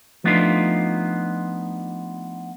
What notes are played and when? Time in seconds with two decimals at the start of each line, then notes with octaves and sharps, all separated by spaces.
0.24 F3 A3 B3 D4 D#4 F4